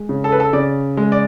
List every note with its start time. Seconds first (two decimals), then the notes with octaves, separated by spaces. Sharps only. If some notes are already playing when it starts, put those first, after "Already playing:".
Already playing: G#3
0.09 C#3
0.24 A4
0.32 B4
0.40 A4
0.53 C#3 D5
0.97 G#3
1.12 D5